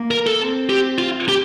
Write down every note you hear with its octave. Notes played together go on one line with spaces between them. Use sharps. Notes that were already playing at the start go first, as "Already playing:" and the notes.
Already playing: A#3
A#4
A4
C4
G4
F4
G4